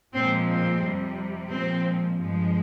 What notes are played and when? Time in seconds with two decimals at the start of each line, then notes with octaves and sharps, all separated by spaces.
0.14 A#2 F3 G#3 C4
0.49 C4
0.82 F2 C3 G3
1.50 A#2 F3 G#3 C4
2.19 G2 F3 G#3